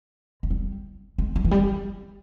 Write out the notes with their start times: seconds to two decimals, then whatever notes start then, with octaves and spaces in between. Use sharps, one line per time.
0.43 G#3
0.50 G3
1.18 G#3
1.36 G3
1.45 E3
1.51 G3